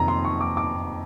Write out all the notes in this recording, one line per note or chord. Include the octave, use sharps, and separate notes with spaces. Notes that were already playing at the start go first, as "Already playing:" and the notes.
Already playing: F2 C3 D#3 A#5
C6
C#6
D6
D6